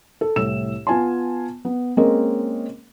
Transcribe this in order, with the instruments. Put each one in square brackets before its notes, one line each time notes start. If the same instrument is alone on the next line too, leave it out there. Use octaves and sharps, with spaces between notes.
[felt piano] A4
C2 A2 E6 E7
B3 F4 G#5 A5 C6
B3
G#3 A#3 C4 C#4 A#4 D#5